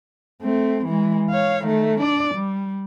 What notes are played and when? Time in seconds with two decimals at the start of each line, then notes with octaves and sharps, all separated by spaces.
0.42 A3 C4
0.85 E3 G#3
1.30 C#5 F5
1.64 D#3 A3
2.01 D4 D5
2.35 G3